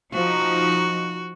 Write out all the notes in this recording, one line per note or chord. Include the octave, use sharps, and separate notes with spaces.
F3 D#4 F#4